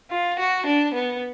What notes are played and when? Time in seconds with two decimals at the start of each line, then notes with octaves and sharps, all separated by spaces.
0.10 F4
0.39 F#4
0.66 D4
0.94 B3